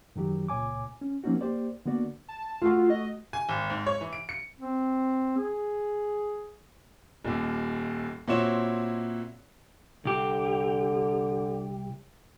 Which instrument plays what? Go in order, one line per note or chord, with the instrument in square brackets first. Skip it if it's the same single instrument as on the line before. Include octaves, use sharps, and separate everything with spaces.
[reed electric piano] F#2 D#3 F#3 G4
C#2 A#2 C#5 G#5 D6
C#4
F3 A#3 C4 C#4 D#4 F#4
A#3 G4 C5 D5
D3 A#3 B3 F#4 D5
[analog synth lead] A5
[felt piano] A3 F#4 [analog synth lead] F4
[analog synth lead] D#5
[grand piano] G#5
G#1
G#2
C#5
E3
D7
C#7
[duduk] C4
G#4
[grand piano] D#1 D#2
A#2 C4 E4 F#4 C#5 E7
[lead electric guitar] C2 G4 [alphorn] D3